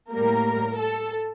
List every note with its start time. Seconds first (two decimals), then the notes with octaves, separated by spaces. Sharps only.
0.13 A2 G3 A#3 A#4
0.78 A4